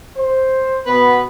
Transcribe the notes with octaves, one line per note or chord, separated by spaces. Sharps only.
C5
B2 B3 B4